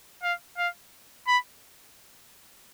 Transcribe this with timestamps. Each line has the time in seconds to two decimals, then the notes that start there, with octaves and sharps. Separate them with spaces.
0.23 F5
0.58 F5
1.27 B5